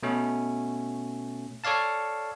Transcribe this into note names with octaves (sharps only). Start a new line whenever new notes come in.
B2 A3 C#4
A4 C#5 D5 F5 A5